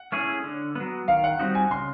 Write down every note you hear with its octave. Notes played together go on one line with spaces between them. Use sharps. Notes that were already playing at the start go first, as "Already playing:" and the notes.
Already playing: F#5
A3 C#4 E4 G#4
D3
F#3 B3
D#3 F5
F#5
G3 C4 D#4 F#4
G#5
C#3 C6